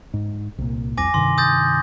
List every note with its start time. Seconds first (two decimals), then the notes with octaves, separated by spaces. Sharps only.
0.14 G#2
0.58 C2 A#2
0.97 C2 F2 G#5 D6 A#6
1.14 G2 C3 D#3 C6
1.38 D#6 G6 A6